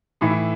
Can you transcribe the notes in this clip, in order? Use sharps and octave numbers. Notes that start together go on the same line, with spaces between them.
A2 E3 D#4
E4